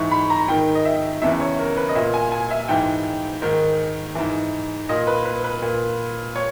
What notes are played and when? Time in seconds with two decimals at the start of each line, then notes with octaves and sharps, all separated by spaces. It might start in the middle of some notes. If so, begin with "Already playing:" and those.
Already playing: G#2 E3 C#6
0.11 B5
0.30 A#5
0.48 G#2 D#3 G5
0.75 D#5
0.85 E5
1.22 E2 C#3 E3 E5
1.40 C#5
1.59 A#4
1.77 B4
1.89 D#5
1.95 A#2 E5
2.14 G#5
2.32 G#5
2.51 E5
2.68 G#2 E3 G5
3.42 G#2 D#3
4.15 G#2 E3
4.89 A#2 D#5
5.07 B4
5.25 B4
5.44 B4
5.62 A#2
6.36 C#5